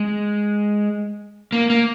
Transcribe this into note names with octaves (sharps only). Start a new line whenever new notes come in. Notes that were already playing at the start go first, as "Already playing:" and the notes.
Already playing: G#3
A#3
A#3